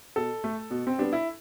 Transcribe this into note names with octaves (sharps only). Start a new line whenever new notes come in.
B2 A4
A3
B2
C4
G3 B3 D4
E4